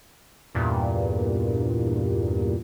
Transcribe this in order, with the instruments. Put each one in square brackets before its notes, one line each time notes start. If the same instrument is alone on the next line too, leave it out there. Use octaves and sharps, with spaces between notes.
[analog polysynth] E2 G2 A#2